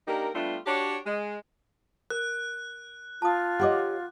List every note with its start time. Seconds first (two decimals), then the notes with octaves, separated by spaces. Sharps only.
0.07 A#3 D4 D#4 G4 A#4
0.34 G3 A3 B3 D4 F4
0.66 D4 F#4 G4 C#5
1.06 G#3
2.10 A#4 F#6
3.22 F4 A5 D#6
3.60 G4 C#5 D#5 F#5 C6 D6